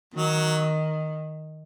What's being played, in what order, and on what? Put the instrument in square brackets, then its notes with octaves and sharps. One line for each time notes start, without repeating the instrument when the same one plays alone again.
[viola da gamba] D#3 [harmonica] F#3